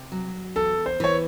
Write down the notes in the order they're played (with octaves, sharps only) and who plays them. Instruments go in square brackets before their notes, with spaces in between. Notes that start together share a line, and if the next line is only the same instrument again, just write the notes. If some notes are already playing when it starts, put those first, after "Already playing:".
Already playing: [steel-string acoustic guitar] C3
F#3
[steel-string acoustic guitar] E2 [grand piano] A4
[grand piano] C5
[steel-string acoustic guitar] E3 [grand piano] C#5